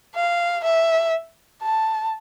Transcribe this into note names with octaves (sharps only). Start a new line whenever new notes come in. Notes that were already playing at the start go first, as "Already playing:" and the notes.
F5
E5
A5